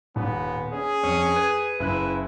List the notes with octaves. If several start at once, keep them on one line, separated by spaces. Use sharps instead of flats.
D#1 B3
C#4 G#4
F2 C#4
B4 G#6
F#1 C#3 E4 F#6